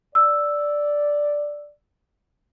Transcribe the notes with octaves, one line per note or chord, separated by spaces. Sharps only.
D5 E6